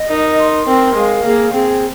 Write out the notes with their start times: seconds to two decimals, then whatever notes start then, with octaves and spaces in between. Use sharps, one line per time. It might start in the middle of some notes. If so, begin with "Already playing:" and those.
Already playing: D#5
0.10 D#4 A#4
0.39 C6
0.67 C4 A#4
0.96 G#3 F5
1.25 A#3 G#4
1.53 C4 G#4